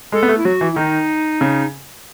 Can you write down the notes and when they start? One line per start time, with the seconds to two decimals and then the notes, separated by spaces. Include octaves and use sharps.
0.12 G#3 A4
0.23 B3
0.29 A3
0.38 E4
0.45 F#3 F#4
0.61 E3
0.72 E4
0.76 D#3 D#4
1.41 C#3